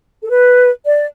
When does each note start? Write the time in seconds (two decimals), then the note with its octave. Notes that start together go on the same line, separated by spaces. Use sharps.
0.22 A4
0.30 B4
0.85 D5